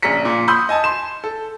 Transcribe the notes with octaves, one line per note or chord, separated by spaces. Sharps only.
A#1 C#3 A#5 B6 C#7
A#2
B5 C6 D#6 E6 G6
D#5 G#5 A5
C6 E7
A4